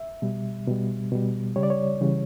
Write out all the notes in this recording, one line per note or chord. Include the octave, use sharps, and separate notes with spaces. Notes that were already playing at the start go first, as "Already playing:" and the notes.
Already playing: E5
B2 G3
B2 G3
B2 G3
C#3 G3 C#5
D5
C#5
C#3 E3 G3